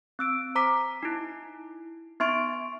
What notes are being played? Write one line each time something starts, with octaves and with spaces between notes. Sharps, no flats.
C4 E6 D7
C5 A#5 D6 B6
D#4 E4
B3 D#4 E5 C6 C#6 D7